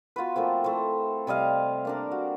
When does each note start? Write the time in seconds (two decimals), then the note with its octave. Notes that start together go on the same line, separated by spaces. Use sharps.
0.16 B3 F4 F#4 B4
0.36 F3 A3 A#3 C4
0.64 A3 E4 C5
1.27 C3 G3 D#5 F5
1.85 A#3 D4 A#4
2.12 F#4